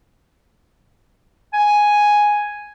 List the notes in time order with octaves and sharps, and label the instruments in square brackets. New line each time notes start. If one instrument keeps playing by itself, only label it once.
[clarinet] G#5